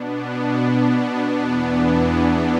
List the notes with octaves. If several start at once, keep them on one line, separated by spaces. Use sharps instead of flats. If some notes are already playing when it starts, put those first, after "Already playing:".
Already playing: B2 B3 D4
E2 E3 B3 D4